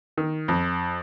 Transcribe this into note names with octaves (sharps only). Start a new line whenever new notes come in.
D#3
F2